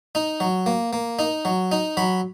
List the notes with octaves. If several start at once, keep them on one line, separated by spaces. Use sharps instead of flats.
D#4
F#3
A#3
A#3
D#4
F#3
D#4
F#3 B5